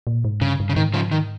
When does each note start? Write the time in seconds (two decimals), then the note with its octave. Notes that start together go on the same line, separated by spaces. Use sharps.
0.07 A#2
0.24 G#2
0.41 G2 C#3
0.60 G2
0.69 C#3
0.76 G#2 D#3
0.94 C#3 F3
1.11 D#3